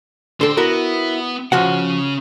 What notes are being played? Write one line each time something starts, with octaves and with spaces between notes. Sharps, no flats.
D3 A4 C5 G5
B3 E4 F#4 A#4
C#3 F3 C#4 F#4 F#5